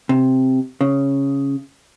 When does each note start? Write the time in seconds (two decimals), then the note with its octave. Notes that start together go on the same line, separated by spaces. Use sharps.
0.09 C3
0.81 C#3